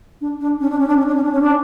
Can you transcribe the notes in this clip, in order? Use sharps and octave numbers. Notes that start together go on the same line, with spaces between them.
D4
D4
C#4
D4
C#4
D4
C#4
D4
C#4
D4
C#4
D4